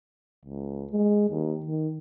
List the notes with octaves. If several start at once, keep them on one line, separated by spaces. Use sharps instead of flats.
C#2
G#3
D#2
D#3